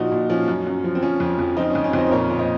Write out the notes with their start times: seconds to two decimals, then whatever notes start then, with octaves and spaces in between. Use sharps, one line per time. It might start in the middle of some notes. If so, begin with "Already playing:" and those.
Already playing: A#2 F3 D#4 F#4
0.12 A#2
0.30 F3 C#4
0.48 F#2
0.67 F#2
0.84 F3
0.95 C4
1.03 F3 C#4
1.20 F2
1.39 F2
1.57 F3 C4 D#4
1.70 F2 C#4
1.84 C#4
1.93 F2 C4 D#4
2.07 C5
2.11 A#2 A#4 C#5
2.30 A#2
2.39 C5 D#5